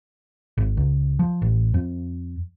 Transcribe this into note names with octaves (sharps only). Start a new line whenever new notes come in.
G#1
C#2
F3
A1
F2